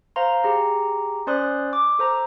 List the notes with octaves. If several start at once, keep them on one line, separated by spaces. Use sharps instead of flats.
C5 F5 A#5 C6
G4 G#4 A#5
C#4 C5 D5 C6 D#6 F#6
D6
A4 C5 A#5